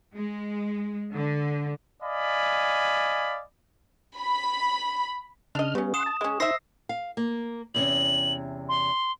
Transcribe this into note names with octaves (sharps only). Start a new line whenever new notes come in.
G#3
D3
D5 D#5 F5 G#5 B5
B5
C#3 D4 D#5 F6
C#3 G3 B3 C#4
F#5 C6 D#6 E7
A5
G#3 C#4 G#4
D#4 C5 E5 E6 A#6 C7
F5
A#3
E2 C3 C#4 F#7
C6